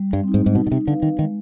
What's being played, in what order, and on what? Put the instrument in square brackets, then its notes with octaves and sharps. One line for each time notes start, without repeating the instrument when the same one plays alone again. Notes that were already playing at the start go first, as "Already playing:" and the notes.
Already playing: [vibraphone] G3
[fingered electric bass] G2
[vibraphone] C4 D#4
[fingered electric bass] G#2
G#2
[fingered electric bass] B2 [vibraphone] D#4
[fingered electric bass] B2
C3
[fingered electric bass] D3 [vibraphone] B4 F5
[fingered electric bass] D#3
[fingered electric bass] D#3 [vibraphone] G#3